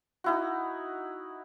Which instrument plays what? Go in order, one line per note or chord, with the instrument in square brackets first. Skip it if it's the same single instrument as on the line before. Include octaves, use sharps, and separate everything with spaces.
[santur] D#4 E4 F#4